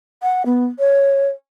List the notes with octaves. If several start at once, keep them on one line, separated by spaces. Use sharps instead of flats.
F#5
B3
C#5